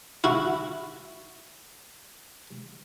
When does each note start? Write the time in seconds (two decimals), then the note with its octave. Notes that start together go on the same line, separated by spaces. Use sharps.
0.24 E4 F#4